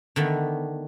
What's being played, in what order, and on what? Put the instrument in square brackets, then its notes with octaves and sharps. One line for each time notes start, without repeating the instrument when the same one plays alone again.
[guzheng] D3 D#3 A3 B3